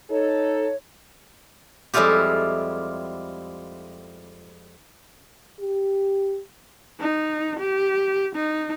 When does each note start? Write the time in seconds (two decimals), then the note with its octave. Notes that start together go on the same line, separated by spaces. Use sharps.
0.11 D#4 A4 C#5
1.94 F2 G3 G#3 E4 F4 G4
5.60 G4
7.00 D#4
7.59 G4
8.35 D#4